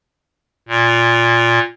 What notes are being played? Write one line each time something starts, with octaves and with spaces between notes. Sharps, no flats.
A#2